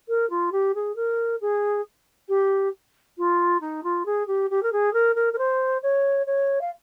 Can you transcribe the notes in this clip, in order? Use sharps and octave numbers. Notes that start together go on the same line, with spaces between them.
A#4
F4
G4
G#4
A#4
G#4
G4
F4
D#4
F4
G#4
G4
G4
A#4
G#4
A#4
A#4
A#4
C5
C#5
C#5
F5